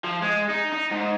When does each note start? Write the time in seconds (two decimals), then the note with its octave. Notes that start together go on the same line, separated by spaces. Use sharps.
0.04 F3
0.22 G#3
0.50 D#4
0.72 D#4
0.91 G#2